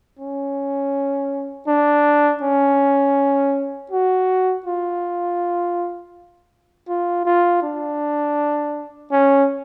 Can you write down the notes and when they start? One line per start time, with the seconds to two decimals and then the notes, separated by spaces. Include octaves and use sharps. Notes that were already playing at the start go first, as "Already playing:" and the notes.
0.19 C#4
1.67 D4
2.42 C#4
3.91 F#4
4.66 F4
6.89 F4
7.25 F4
7.62 D4
9.12 C#4